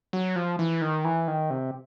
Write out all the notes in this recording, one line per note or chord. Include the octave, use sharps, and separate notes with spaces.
F#3
F3
E3
D#3
E3
D#3
C3